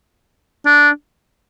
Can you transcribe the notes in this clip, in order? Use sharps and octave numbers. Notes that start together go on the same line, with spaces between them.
D4